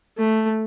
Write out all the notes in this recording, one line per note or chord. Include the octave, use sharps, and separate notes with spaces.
A3